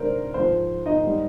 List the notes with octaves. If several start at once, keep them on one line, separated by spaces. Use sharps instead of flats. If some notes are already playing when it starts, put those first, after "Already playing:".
Already playing: C3 D#3 G#3 D4 A#4 C5
G#2 F3 G#3 C5
D#4 D#5
G#2 G3